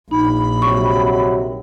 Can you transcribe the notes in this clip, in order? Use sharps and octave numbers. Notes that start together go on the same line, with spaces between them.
A#1 D#4 B5
C3 D#3 F#3 C#6